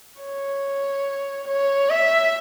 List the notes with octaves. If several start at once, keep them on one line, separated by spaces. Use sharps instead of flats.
C#5
C#5
E5